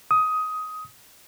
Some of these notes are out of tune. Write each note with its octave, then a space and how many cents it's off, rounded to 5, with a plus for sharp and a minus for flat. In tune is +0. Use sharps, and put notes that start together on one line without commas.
D#6 +15